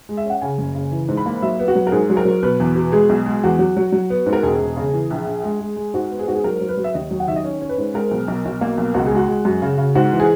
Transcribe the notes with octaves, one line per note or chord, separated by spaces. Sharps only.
G#3
E5
C#4 F#5
C#3 G#5
F#1
C#3
E3
G#2
B5
A#3
F#3 E5
B3
F#4
F#3
A#4
G#2 G#4
F#3
A#4
F#3
B2 B4
E2
B2
G#3 G#4
B1
G#3
E2 F#4
F#3
F#3
F#3
B3
G#2
A#4
E1 G#4
E1
C#3
E3
A#1
A#1
G#3
G#3
G#3
G#2 F#4
B3
G#4
G#2 F#4
G#4
F#3 A#4
F#3
B4
F#3
E5
D#2 D#5
F#3
F#5
D#3 E5
D#5
C#4 C#5
C#4
B4
G#2
G#3 A#4
B1
B1
B1
A#3
B1
C#2 F#4
G#4
G#3 F#4
G#3
F#2
C#3
C#3
G#2 F#4
E3
G#4